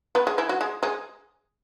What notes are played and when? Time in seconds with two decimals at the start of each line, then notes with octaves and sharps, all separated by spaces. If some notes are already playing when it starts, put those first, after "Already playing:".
0.15 B3 B4
0.27 G#3 G#4
0.38 E3 E4
0.49 F#3 F#4
0.61 G#3 G#4
0.83 G#3 G#4